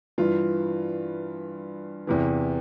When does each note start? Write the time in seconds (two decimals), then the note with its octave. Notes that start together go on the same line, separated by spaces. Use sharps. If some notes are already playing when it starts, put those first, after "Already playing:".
0.18 G2 E3 F4
2.07 E2 C3 E3